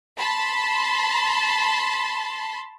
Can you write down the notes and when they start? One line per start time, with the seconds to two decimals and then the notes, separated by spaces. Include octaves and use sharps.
0.17 A5 B5 C6